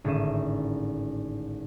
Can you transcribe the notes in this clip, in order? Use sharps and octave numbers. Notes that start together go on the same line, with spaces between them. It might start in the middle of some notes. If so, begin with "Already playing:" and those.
G#1 A2 D3 C#4 D#7 E7